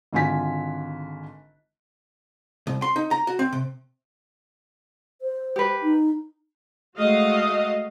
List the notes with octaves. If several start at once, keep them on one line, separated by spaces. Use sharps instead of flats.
G#1 D3 F4 G#5 B6
C2
C6
D#4
A#5
F#4
C4
C3
C5
G4 B4
D#4
G#3 A3 F#4 D#5 F5